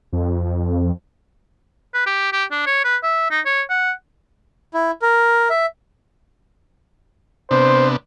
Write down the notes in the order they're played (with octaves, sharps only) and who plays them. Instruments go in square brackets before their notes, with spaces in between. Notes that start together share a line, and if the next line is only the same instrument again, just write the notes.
[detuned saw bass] F2
[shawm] B4
G4
G4
D4
C#5
B4
E5
D#4
C#5
F#5
[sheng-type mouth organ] E4
A#4
E5
[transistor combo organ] C3 B3 D4 [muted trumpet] C5